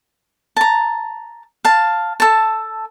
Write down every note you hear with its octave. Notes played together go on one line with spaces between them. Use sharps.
A5 A#5
F5 A5
A4 A5